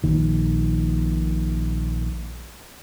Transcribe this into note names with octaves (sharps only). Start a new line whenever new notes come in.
A#1 A#2 D#3